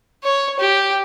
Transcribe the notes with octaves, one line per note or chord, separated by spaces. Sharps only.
C#5
G4